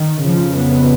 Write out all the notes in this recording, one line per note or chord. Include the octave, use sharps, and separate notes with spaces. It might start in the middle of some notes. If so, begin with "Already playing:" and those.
Already playing: D#3
F2 C#3 F3
B3